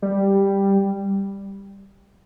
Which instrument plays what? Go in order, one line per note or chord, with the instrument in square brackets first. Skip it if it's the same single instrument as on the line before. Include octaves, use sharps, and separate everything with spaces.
[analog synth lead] G3